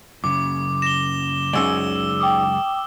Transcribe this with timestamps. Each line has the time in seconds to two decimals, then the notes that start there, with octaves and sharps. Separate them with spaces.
0.24 F#2 C#3 D6
0.82 A#6 E7 G7
1.53 C#2 F#2 C#3 D#4 G#4 D5 E6 G7
2.20 G5 D6 D#6